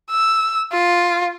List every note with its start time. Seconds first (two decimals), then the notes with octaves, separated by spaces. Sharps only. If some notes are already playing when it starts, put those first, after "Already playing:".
0.10 E6
0.72 F4